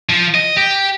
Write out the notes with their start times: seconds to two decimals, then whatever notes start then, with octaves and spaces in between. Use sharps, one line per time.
0.10 F3
0.35 D#5
0.57 G4